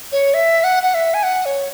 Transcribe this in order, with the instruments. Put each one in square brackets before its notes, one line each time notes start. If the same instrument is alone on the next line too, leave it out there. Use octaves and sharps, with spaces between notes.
[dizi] C#5
E5
F#5
F#5
E5
G#5
F#5
C#5